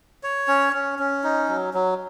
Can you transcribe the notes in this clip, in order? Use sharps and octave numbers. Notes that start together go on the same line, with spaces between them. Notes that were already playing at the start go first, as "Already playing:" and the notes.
C#5
C#4
C#4
C#4
D#4
F#3
F#3